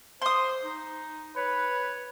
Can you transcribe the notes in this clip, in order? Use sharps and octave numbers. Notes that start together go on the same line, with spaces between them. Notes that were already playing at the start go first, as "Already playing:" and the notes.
C5 C6 D#6
D#4
B4 C#5